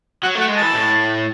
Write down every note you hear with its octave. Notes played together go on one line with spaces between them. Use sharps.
F#3 F#5
A3
F#5
G#3
A5
E3
A2